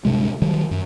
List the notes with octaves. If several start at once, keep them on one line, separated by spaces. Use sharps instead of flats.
D1 G2 C3 G#3
D#3 F#3 G3
F#2